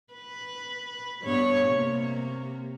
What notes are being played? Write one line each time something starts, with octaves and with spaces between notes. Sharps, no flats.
B4
G2 B3 C#5
C3 A#3